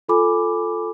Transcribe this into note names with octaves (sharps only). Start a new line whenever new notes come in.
F4 A4 G#5 B5 D6